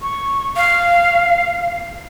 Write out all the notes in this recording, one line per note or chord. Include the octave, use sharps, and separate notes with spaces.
C#6
F5